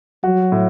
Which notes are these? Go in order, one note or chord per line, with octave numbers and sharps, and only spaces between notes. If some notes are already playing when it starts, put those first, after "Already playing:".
F#3 F#4
A2